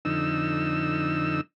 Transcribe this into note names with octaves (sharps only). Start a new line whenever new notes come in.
F2 D3 D#4 E6